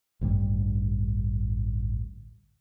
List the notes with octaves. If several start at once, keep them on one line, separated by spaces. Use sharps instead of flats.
A1 D2 G2 G3